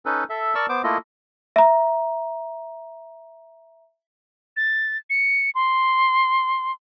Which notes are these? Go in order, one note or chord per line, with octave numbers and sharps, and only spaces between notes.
C#4 D#4 A4 B4
A4 E5
A#4 D5 A5 C#6 E6
B3 C5 D6
A3 A#3 E4 F4 A4 D#5
E5 A#5
A6
C#7
C6